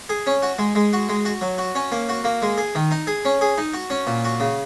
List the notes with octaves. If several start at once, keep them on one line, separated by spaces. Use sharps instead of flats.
G#4
C#4
F#4
G#3
G#3
F#4
G#3
F#4
F#3
F#4
C#4
A#3
F#4
A#3
G#3
G#4
D#3
D#4
G#4
C#4
G#4
D#4
F#4
C#4
A#2
F#4
C#3